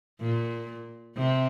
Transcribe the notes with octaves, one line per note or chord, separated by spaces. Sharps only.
A#2
C3